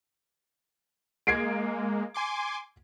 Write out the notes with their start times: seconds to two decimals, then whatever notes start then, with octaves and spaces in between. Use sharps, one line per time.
1.27 G#3 A#3 G#6 C7 D7
2.14 G#5 C6 D6